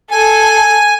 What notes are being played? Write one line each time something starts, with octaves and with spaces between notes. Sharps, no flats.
A4 G#5